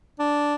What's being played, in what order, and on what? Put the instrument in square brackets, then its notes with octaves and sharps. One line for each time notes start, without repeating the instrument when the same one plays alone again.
[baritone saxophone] D4